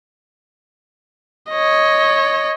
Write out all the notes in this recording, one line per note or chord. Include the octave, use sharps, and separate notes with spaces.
C#5 D#5